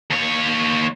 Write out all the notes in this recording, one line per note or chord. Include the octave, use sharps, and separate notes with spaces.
D#2 C#5